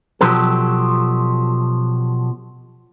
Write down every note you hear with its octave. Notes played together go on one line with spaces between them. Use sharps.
B2 F3 F#3 G4 A4